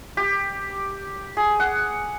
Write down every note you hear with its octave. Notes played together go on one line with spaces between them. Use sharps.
G4
G#4
F#5